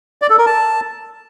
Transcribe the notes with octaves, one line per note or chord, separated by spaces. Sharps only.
D5
A4
A#4
A5